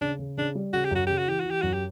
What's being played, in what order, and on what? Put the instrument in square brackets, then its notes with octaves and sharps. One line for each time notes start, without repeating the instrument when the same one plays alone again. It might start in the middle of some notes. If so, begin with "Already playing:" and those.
[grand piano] C#3 [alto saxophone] D4
[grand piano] C#3
[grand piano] C#3 [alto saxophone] D4
[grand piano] G3
[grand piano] C#3 [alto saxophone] F#4
[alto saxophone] G4
[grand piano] F#2 [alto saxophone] F#4
[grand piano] C#3 [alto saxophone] G4
[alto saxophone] F#4
[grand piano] E3 [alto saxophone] G4
[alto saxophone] F#4
[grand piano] E3
[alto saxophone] G4
[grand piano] F#2 [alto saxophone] F#4
[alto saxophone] G4